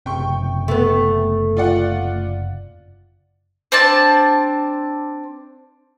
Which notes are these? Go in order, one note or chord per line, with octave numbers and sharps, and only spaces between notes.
F#1 C3 C4 G5 C#6
A3 B3
F4 D5 F#5
C4 D4 A5